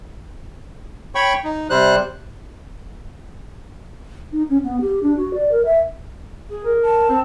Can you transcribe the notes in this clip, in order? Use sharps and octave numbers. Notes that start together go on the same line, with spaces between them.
C#5 G5 B5 C#6
D#4
C3 G3 C5 F#6
D#4
C#4
B3
G4
D4
F#4
D5
A#4
E5
G#4
A#4
A5
C4